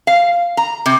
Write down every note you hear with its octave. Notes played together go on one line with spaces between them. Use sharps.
F5
A#5
C3